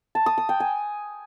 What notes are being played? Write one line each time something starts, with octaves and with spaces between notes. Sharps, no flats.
A5
D#6
D#6
G5
G#5